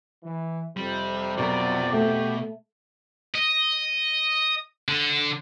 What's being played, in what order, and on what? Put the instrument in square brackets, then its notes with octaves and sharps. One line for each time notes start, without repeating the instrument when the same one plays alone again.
[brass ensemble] E3
[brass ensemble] F2 C3 [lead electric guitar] G3
[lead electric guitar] B2 [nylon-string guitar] F#3 A#4 [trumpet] D5
[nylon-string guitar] A3 [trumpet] G4
[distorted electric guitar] D#5
D3